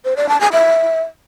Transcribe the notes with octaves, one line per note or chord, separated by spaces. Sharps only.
C5
D5
A5
G#5
E5